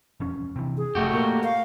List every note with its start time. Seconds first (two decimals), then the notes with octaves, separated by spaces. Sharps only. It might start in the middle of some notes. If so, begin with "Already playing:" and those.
0.20 E1 F2 C#4
0.56 C3 E3
0.77 G#4
0.95 F1 A3 F#4 G4
1.13 A#2 A#3
1.43 F5